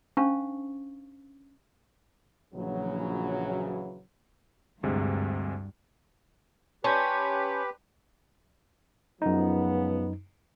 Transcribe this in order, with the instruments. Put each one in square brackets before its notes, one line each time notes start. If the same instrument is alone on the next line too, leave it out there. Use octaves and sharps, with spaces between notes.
[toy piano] C#4 D4 C5 F5 A5 C#6
[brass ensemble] A#1 C#3 E3 F#3
[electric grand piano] D2 C3 G#3 [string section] G2
[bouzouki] C#4 [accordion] G4 B4 [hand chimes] A5 C6 G6
[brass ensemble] C#2 F3 B3 [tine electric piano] F#2 D#4